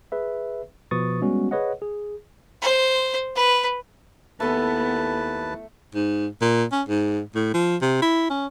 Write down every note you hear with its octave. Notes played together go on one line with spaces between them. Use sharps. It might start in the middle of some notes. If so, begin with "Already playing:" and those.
G#4 B4 E5
B2 F3 B4 C#6 D#6 A6
G3 G#3 B3 C#4 F#4
G#4 B4 C#5 D#5 F#5
G#4
C5
B4
D#2 A3 B3 E4 A4 B4 G#5 A5
G#2
A#2
C#4
G#2
A2
F3
C3
E4
C#4